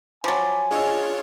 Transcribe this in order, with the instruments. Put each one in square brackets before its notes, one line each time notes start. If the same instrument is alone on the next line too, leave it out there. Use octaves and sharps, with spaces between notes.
[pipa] F3 F#3 [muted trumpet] G#5 [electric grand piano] B5 D6 A6
[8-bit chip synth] D4 F4 C#5 [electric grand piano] G#4 D#5 E6